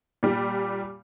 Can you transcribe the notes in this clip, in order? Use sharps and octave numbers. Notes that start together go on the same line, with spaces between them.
A#2 G3